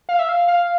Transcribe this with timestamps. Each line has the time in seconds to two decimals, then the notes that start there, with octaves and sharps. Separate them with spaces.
0.09 F5
0.19 E5
0.29 F5
0.48 F5